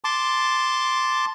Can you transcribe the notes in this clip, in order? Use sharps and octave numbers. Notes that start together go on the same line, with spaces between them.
A5 C6 D6